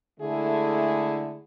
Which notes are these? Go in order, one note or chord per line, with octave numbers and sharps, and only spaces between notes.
D3 G#3 A3 E4 G#4